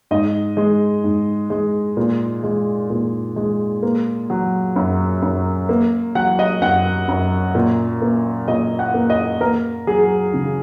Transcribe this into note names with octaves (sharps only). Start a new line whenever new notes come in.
G#2 D#5
G#3
G#2
G#3
A#2
G#3
A#2
G#3
A#3
F#3
F#2
F#2
A#3
F#3 F#5
D#5
F#2 F#5
F#2
A#2
A#3
A#2 D#5
F#5
A#3
D#5
A#3 A#4
F#3 G#4
C#3